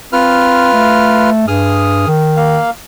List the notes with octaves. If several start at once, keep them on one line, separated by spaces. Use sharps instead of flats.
C4 F4 B4 F6
A3
G2 G#4 D#6 F6
D#3
A#3 F5